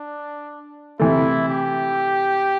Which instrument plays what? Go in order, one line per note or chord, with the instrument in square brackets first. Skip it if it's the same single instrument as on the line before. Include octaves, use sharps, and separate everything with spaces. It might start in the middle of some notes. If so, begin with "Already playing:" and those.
Already playing: [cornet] D4
[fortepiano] C3 E3 A3 [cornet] E4
[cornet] G4